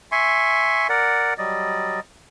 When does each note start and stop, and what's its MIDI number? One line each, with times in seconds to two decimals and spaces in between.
0.12 0.87 76
0.12 0.87 80
0.12 0.87 84
0.12 0.87 85
0.89 1.34 70
0.89 1.34 74
0.89 1.34 78
1.38 2.00 54
1.38 2.00 55
1.38 2.00 74
1.38 2.00 75